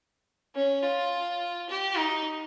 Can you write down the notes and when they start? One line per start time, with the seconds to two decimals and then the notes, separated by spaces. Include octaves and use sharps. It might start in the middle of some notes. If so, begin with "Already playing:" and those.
0.54 C#4
0.83 F4
1.69 G4
1.97 D#4